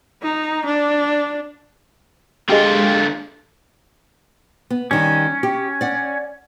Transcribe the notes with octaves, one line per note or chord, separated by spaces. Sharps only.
D#4
D4
D3 G#3 F4 G4
B3
D#3 G3 C#4
G4
D5 F#5